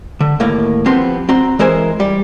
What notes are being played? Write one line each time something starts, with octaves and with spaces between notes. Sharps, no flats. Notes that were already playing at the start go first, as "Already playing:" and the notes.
D3
D#2 A2 A#3
F3 B3 C4 G4 C6
C4 F#4 A#5 C6
E3 G#3 A#4 C5 G#5
G3